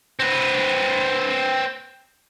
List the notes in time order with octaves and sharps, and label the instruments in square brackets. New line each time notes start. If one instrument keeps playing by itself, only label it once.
[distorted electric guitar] C4 B4